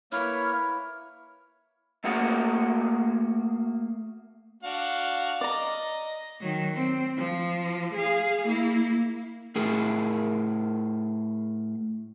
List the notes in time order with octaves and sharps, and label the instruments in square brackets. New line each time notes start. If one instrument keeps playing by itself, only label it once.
[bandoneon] A#3 C#5 [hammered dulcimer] E4 B4 [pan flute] F6
[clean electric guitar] A3 A#3 F#4 G#4 A#4
[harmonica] D4 F#4 F5
[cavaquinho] D5 A#5 [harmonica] D#5
[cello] D#3 F#3
C4
F3
G#4 F5
A#3 E4
[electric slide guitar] A2 G#4 A#4